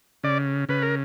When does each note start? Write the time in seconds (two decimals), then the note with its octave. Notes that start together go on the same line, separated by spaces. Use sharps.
0.23 C#3 D5
0.69 C#3 B4
0.82 A#4